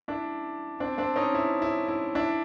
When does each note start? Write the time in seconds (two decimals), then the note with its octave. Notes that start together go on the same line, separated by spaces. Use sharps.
0.08 D4 E4
0.80 C4 D4
0.98 C4 D4
1.16 C#4 D#4
1.34 E4
1.62 E4
1.88 E4
2.15 D4 E4